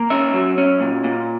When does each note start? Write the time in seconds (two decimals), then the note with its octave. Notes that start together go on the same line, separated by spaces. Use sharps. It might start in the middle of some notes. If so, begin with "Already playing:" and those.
Already playing: A#3
0.10 C#4 E5
0.34 F#3
0.58 C#4
0.80 A#2
1.04 A#2